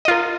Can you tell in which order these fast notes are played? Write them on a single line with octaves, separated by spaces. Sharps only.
D#5 F4 A#4